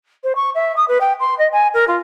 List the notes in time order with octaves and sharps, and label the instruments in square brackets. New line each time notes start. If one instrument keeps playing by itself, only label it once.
[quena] C5
C#6
E5
D#6
B4
G5
C6
D#5
G#5
A#4
F4